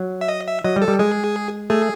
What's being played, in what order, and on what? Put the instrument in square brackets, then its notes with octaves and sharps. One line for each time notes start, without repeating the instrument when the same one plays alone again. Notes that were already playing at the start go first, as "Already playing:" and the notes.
Already playing: [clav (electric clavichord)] F#3
[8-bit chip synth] E5
D#5
E5
[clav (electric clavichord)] F#3 [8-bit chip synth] D#5
[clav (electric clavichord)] G3
[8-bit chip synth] A4
[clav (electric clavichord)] G3
[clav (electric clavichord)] G#3 [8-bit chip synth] G#4
[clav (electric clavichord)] A3 [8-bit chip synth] G#4